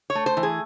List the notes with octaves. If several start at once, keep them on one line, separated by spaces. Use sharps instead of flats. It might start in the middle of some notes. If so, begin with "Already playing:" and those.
C#5
A3
C5
E3
G#4